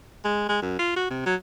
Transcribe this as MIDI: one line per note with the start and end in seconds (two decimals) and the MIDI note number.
0.25 0.46 56
0.49 0.61 56
0.62 0.78 42
0.79 0.94 65
0.96 1.06 66
1.10 1.21 48
1.26 1.35 54